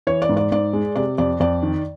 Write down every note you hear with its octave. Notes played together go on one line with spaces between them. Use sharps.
E3 C#5
D5
G#2
D5
G#2 D5
G#3
C3 D5
F2 D5
F2 D5
D#3